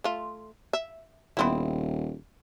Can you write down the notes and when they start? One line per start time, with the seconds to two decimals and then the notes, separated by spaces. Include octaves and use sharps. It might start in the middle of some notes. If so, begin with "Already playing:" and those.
0.04 A3 F4
0.73 E5
1.37 D#1 B3 C4 E4